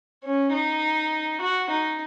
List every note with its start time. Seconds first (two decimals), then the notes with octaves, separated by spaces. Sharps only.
0.24 C#4
0.52 D#4
1.41 F#4
1.70 D#4